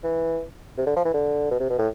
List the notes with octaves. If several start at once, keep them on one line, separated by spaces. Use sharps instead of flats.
E3
C3
D3
F3
E3
D3
B2
C3
B2
A2